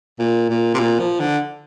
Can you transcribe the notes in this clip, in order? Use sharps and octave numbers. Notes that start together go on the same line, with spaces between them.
A#2
A#2
C3
A#2
F3
D3